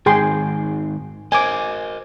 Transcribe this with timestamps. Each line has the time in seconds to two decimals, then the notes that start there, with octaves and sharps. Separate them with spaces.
0.06 G#2 D#3 G#4 G5 C6
1.32 A#4 C5 D#5 G#5 D6